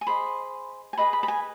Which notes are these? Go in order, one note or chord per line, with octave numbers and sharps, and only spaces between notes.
G#5
G#4 C5 D#5 B5
G#5
G#4 B4 D#5 B5
B5
B5
G#5